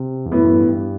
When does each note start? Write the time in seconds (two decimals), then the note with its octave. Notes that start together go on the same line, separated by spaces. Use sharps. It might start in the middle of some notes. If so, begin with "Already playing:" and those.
Already playing: C3
0.26 E2
0.32 F#2 A2 E3 B3
0.44 F#2
0.56 G2
0.68 G2